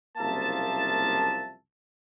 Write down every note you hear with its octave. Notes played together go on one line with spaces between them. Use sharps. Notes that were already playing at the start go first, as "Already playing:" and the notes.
F#1 C2 F3 A#3 E5 A5